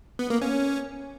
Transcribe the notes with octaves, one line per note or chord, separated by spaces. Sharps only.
B3
A#3
C#4